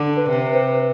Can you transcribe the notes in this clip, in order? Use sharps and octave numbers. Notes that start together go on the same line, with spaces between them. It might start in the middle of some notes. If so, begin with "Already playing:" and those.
Already playing: D3
B4
C3
B4
C5
B4